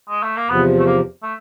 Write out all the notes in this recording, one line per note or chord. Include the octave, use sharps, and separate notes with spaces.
G#3
A3
A#3
E2 C3 F3 B3
A3
A#3
A3